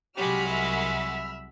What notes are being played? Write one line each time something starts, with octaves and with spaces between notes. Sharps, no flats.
C2 F#3 G#3 F#4 G4 B5 F6
E5